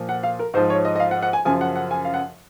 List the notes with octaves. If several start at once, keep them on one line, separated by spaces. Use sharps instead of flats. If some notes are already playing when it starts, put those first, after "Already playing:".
Already playing: A#2 F3
F#5
F5
A#4
G#2 F3 C5
C#5
D#5
D#5
F5
F#5
F#5
G#5
F#2 C#3 F3 G#5
F#5
F#5
G#5
F5
F#5